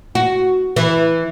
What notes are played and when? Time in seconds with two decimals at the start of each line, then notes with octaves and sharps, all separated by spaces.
0.15 F#4
0.76 E3